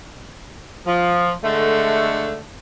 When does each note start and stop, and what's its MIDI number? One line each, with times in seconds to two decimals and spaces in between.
0.86 1.32 53
1.43 2.41 50
1.43 2.41 56
1.43 2.41 57